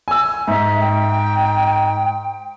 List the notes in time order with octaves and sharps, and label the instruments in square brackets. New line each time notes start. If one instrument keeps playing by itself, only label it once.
[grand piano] G#5 E6
[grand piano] G#2 [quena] E5
[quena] G5